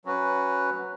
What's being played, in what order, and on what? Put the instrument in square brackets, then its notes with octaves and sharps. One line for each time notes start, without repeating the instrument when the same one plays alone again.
[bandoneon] F#3 C#4 F#4 B4